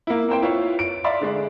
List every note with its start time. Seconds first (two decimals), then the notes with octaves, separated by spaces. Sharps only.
0.07 A#3 E4
0.29 A#3 C4 C5 G5
0.42 E4 F4 B4 C#5
0.79 D7
1.04 D5 E5 F5 C6
1.21 D3 G#3 D4